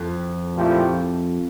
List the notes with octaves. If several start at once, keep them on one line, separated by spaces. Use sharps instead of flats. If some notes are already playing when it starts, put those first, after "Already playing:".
Already playing: F2
A#2 F3 A3 E4 G4